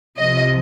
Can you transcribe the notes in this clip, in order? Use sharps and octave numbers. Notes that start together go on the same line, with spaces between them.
C2 C3 F3 D#5